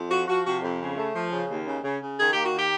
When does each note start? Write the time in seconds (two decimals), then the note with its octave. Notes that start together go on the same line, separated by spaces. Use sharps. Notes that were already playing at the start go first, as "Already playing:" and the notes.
Already playing: F2
0.10 F3 F#4
0.28 F3 F#4
0.45 C3 F#4
0.62 F2
0.80 C#3
0.97 A3
1.14 F3
1.32 C#3
1.49 D#2
1.66 C#3
1.83 C#3
2.01 C#3
2.18 D#3 G#4
2.31 A#3 G4
2.45 F#4
2.53 D#3
2.58 G4